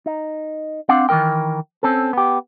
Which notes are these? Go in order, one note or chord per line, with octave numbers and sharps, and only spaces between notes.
D#4
C4 D4 F5 F#5
D#3 E3 C4 A#4 G5
C4 C#4 A4
B3 G4